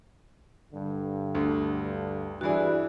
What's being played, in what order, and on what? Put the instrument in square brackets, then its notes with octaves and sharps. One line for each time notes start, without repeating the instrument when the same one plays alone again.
[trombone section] G2 D3
[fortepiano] D2
[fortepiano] G2 E3 G#4 [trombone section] E4 B4 [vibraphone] F#4 D5